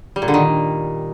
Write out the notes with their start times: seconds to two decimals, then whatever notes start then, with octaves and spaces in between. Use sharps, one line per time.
0.16 G3
0.22 A#2
0.28 D3
0.34 D#3